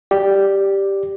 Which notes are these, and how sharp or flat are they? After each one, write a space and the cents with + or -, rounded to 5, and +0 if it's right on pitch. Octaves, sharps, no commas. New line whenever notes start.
G4 +0 D5 +0